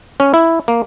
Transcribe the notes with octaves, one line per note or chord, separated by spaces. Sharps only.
C#4
E4
A#3